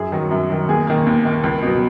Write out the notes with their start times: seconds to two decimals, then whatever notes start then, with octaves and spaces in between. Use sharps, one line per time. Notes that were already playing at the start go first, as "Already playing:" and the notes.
Already playing: F#2 G#4
0.12 D#3 F#3
0.31 F#2
0.50 D#3 F#3
0.68 D#2 G#4
0.87 D#3 A#3
1.06 D#2
1.25 D#3 A#3
1.44 C#2
1.62 B2 F#3